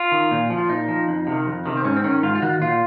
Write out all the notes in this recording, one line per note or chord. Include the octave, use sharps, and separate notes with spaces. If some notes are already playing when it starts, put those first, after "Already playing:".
Already playing: F4
D#3
A#2
F3
F4
A#2 D#4
F3
F2
C3 D#3
F2
C3 D#3
C4
G#2 C#4
C4
D#3 C#4
G#2 F4
F4
D#3 F#4
A#2 F4